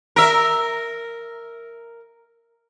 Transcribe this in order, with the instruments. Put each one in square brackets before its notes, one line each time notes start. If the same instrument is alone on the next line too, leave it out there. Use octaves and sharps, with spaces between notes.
[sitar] A#4 E5